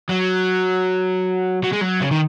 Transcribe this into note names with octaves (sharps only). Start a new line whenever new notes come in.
F#3
F#3
G#3
F#3
C#3
D#3